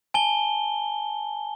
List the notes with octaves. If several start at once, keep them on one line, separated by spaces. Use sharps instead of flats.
G#5 A5 G7